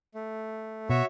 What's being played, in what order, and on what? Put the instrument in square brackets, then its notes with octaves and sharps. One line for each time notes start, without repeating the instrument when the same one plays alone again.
[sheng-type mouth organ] A3
[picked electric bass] B2 [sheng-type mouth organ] F#4 C#5 E5